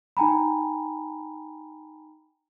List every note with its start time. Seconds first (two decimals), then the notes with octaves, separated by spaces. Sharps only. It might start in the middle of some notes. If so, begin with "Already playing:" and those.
0.17 D#4 G5 G#5 A#5 B5